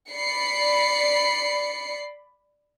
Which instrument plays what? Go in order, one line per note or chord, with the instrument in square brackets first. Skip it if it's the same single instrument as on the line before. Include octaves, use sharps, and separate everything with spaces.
[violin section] D5 B5 C7 C#7